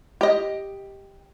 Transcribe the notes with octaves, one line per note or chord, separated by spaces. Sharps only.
G4 D#5